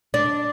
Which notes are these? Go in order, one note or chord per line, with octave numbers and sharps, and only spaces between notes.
D4